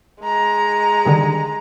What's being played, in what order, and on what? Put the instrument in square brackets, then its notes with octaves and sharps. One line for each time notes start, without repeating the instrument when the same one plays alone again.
[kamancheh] G#3 A#5
[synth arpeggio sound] D3 D#3 G3